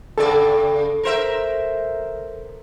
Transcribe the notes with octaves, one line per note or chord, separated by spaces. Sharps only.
G2 C#3 A4 D5
A#4 C5 E5